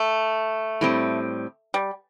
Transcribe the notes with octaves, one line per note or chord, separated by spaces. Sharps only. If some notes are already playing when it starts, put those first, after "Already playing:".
Already playing: A3
A2 G3 C4
G3